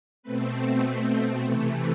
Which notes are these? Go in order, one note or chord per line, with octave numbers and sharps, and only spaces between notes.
B2 A3 C4 B4
A4
B4
G5
C3 E3 A3